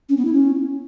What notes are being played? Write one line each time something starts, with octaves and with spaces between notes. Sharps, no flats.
C#4
B3
E4
C#4